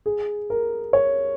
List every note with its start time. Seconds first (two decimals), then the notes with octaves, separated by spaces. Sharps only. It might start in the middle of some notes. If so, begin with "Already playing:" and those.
0.06 G#4
0.50 A#4
0.93 C#5